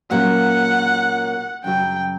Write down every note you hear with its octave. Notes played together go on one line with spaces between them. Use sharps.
A#2 F#3 A#3 C#4 F#5
F#2 C#3 F#3 G5